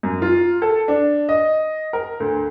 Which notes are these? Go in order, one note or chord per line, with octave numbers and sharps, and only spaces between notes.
F#2
F4
A4
D4
D#5
A#4
D2